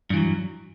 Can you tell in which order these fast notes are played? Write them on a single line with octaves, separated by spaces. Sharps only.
G2 E3 F#3